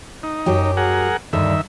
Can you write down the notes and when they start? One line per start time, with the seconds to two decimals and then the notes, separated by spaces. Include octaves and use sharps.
0.23 D#4
0.46 F#2 F#3 G4
0.77 G#4 A#4 F#5
1.33 D2 G2 D3 D#3 E5